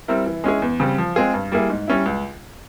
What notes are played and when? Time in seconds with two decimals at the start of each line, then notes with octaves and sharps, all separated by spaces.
0.08 G3 C4 E4 A#4
0.26 E3
0.44 G#3 C#4 E4 G#4
0.62 E2
0.80 C#3 G3 C4
0.98 F3
1.16 G#3 C4 F4 G#4
1.34 G2
1.52 G3 A#3 E4 G#4
1.70 G#2
1.88 G3 C#4 E4
2.06 C#2